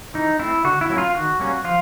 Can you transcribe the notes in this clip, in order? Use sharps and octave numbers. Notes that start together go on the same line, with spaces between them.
E3 D#4
A3 C4 E4
D3 F#4
E4
F#3 A#3 C#4
F4
D#3 F#4
G3 A#3 C#4
F3 F4